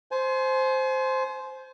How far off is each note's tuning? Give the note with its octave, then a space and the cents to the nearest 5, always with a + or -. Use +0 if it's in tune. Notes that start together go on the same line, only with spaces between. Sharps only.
C5 +0 G#5 +40